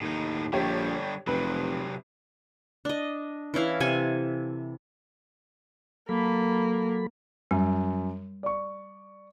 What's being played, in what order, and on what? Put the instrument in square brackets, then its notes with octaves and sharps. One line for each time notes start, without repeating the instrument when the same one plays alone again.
[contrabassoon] D#2 [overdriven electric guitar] A2 D#4
[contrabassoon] A#1 [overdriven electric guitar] D3 G3 [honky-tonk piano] G4 C#5
[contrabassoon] F1 [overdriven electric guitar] C3 F#3 [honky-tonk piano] B4
[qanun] D4 D#5
E3 C#4 E4 F5
C3 A4 G#5
[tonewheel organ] F#3 A4 B5 [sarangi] A#3
[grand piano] F#2 [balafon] G3
[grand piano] D5 C#6